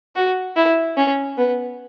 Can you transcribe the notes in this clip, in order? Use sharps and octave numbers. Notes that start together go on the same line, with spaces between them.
F#4
E4
C#4
B3